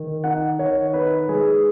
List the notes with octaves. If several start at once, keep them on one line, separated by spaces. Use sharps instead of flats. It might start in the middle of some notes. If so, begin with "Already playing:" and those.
Already playing: D#3
D#4 F#5
D#3 C#5
D#4 B4
G#3 G#4